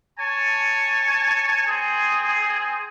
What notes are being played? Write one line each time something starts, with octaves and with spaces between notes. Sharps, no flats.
C#5 G#5 A5
C4 G#4